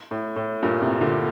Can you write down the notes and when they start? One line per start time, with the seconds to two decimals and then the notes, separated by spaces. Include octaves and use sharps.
0.11 A2
0.36 A2
0.62 G2 A#2
0.81 A2 C3
1.01 A#2 D3